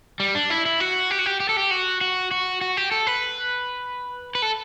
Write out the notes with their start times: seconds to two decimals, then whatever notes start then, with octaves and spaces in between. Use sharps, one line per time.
0.20 G3
0.35 D4
0.50 E4
0.66 E4
0.80 F#4
1.11 G4
1.19 F#4
1.26 G4
1.40 G4
1.49 A4
1.57 G4
1.71 F#4
2.01 F#4
2.31 F#4
2.61 F#4
2.77 G4
2.91 A4
3.07 B4
4.35 B4
4.42 A4